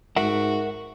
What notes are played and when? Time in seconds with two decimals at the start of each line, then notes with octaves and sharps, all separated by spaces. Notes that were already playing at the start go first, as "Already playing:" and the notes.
0.16 G#2 F#4 A#4 E5 F#5